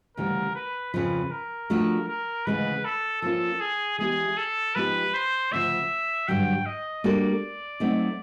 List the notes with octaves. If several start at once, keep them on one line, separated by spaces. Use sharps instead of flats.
D2 C#3 E3 G3 A#4
B4
F2 C#3 F3 B4
A#4
F3 A3 D4 F#4 A4
A#4
D2 C#3 E3 G#3 B4
A4
F3 A#3 C#4 F4 A4
G#4
E3 G#3 B3 E4 G4 G#4
A4
F3 G#3 B3 D#4 G4 B4
C5
D2 C#3 F3 E5
G2 D3 F#3 G5
D#5
G3 A#3 D4 F#4 A4 D5
F#3 A3 C4 D#4